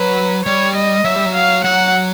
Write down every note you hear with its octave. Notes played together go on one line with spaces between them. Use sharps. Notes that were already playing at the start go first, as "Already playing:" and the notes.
Already playing: F#3 B4
G3 C#5
D#5
F#3 E5
G3
F#3
F5
F#3 F#5